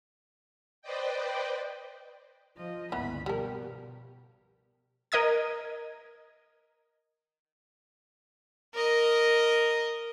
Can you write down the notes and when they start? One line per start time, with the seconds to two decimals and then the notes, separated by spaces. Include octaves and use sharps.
0.82 B4 C5 D5 D#5 G5
2.57 F3 F4 D#5
2.92 G1 C#2 E3 A#3 B3 B5
3.26 B2 F3 G3 B3 G4 A#4
5.12 A#4 D#5 D#6 G#6
8.74 A#4 D#5